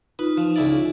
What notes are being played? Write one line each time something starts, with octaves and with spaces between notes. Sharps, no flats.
D#4 F4 B4
F3
C#2 E4 D5